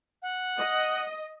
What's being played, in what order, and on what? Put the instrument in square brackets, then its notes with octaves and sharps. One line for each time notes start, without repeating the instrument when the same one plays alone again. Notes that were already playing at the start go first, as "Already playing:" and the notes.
[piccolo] F#5
[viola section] D#5